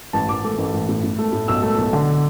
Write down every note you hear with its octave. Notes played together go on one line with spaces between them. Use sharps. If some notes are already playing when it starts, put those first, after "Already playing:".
A1 A5
A1 D6
A3 D6
A1
A1
A2
A2
A3
A2
B1 E6
A3
B1
D3